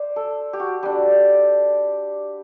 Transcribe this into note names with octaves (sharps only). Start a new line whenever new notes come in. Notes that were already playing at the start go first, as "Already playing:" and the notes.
Already playing: C5 D5
A4
G4
F#4
G3 D4 G4